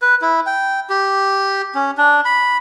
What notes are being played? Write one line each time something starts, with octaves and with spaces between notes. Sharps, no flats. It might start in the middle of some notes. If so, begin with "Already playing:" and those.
B4
E4
G5
G4
C#4
D4
B5